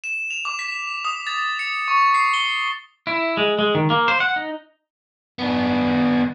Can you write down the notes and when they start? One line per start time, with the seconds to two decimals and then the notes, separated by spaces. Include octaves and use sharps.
0.04 E7
0.30 F7
0.45 D6
0.59 B6
1.05 D#6
1.27 A6
1.59 C#7
1.88 C#6
2.14 C7
2.34 G7
3.07 E4
3.37 G#3
3.59 G#3
3.75 D#3
3.90 A#3
4.08 C5
4.20 F#5
4.36 D#4
5.39 B3 D4